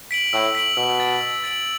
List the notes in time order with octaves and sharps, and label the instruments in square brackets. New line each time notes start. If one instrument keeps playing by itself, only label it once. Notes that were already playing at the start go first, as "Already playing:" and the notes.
[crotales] B6 D7 F#7
[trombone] A2 [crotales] E6
[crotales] B6 D7 F#7
[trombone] B2 [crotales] E6
[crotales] A6 D7 F#7
E6
A6 D7 F#7